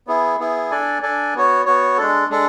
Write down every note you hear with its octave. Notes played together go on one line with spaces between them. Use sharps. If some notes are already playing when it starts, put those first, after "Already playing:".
B3 E4 G#4
B3 E4 G#4
D4 A4 D5 G#5
D4 A4 D5 G#5
B3 F#4 C#5
B3 F#4 C#5
G#3 D4 A4
G#3 D4 A4